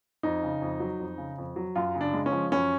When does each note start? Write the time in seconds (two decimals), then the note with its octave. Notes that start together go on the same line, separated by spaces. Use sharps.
0.23 F2 D#4
0.43 C#3
0.62 F2
0.80 F#3
1.00 F2
1.18 C#3
1.38 F2
1.56 F#3
1.76 F#2 F4
1.95 C#3
2.01 D4
2.14 G#3
2.26 C#4
2.32 F3
2.52 F#2 C#4